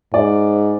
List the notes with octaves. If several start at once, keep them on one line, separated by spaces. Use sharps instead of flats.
G#2 D5